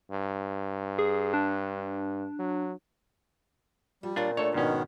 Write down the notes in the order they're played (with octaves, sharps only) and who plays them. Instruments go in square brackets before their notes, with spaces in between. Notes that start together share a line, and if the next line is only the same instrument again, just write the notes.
[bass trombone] G2
[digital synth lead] G#4
D4
[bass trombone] F#3
[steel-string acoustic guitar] F3 [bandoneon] G3
[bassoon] A#2 [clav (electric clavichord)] D4 F4 [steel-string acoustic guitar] C#5 F5 A#5
[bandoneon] A3 [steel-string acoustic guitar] D4 [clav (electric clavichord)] A4 C#5
[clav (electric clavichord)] G#2 C#4 [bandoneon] B2 D#3 B3